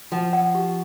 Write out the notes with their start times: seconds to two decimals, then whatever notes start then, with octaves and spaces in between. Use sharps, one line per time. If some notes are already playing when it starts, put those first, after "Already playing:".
0.12 F3 F#5
0.33 F#5
0.55 G4